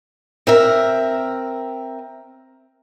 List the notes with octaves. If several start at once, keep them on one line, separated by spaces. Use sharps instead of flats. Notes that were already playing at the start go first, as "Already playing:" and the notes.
C4 A#4 E5